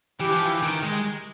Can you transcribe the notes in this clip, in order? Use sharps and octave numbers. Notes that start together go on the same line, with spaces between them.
E3 G4
F3
E3
D#3
G#3